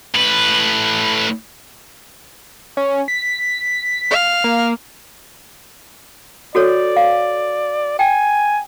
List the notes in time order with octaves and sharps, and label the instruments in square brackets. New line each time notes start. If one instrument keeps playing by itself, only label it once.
[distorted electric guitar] A2 B4
[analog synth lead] C#4
B6
[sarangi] F5
[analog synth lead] A#3
[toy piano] F#4 A4 C#5 [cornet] D5
[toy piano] F5
[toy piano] G5 [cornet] G#5